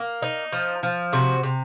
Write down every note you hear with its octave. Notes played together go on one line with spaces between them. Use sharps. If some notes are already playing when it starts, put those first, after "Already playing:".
Already playing: A#3
D#4
F3
F3
C3 F#4
C3